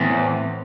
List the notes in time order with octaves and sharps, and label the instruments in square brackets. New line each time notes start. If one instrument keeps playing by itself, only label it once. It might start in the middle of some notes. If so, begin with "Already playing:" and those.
Already playing: [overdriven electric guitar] E2 [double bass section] A2 E3 A3 C4